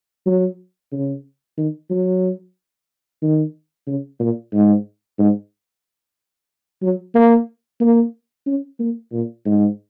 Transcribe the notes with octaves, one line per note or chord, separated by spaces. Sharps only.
F#3
C#3
D#3
F#3
D#3
C#3
A#2
G#2
G#2
F#3
A#3
A#3
C#4
A#3
A#2
G#2